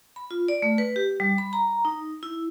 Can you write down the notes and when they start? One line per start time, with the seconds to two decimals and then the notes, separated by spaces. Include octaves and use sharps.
0.16 B5
0.31 F4
0.48 D5
0.62 A3
0.78 B4
0.96 G4
1.20 G3
1.38 B5
1.53 A#5
1.85 D#4
2.23 E4